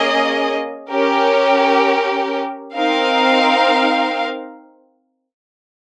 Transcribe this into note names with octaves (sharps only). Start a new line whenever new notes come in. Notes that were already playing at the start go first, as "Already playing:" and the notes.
Already playing: A#3 C#4 G#4 D#5
C#4 G4 A#4
C4 D#4 A#4 F5